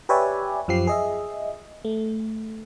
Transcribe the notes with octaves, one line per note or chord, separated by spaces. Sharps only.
G4 B4 C#5 D5 E5 G#5
F#2 F3 G4 C7
G#4 D#5 E5
A3